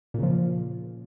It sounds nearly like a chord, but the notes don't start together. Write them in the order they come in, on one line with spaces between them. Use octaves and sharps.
A#2 C#3 F3